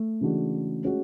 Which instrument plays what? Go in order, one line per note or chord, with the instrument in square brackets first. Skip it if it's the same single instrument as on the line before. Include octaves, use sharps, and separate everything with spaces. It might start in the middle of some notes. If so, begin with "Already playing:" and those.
Already playing: [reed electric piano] A3
[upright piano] C#3 E3 G#3 D4 F#4
G#3 C#4 F#4